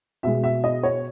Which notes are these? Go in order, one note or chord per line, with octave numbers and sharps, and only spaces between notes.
B2 G#3 E5
E5
D#5
C#5